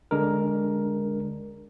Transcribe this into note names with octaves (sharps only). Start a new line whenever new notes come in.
D3 G#3 D4 A#4